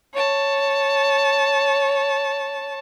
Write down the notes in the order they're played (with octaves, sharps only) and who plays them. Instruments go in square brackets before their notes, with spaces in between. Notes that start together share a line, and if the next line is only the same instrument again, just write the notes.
[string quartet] C#5 A5